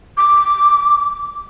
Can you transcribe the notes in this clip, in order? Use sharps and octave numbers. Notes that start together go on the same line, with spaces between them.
D6